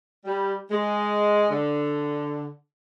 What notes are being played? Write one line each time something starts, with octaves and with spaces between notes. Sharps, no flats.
G3
G#3
D3